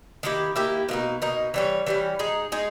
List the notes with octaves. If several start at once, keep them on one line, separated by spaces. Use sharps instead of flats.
D#3 A#3 E4 G4
D#3 A#3 E4 G4
B2 A#3 D#4
B2 A#3 D#4
E3 G3 C#4
E3 G3 C#4
G#3 D#4 G#4
G#3 D#4 G#4